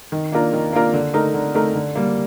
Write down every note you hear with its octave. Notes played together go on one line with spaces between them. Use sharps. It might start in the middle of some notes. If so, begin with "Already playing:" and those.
D#3
A#3 D4 F4 A#4
D#3
A#3 D4 F4 A#4
D3
A3 D#4 A#4
D3
A3 D#4 A#4
D3
G3 A#3